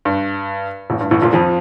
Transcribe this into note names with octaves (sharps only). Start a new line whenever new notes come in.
G2
A1 A2
G2
A1 A2
A#1 A#2
F2 F3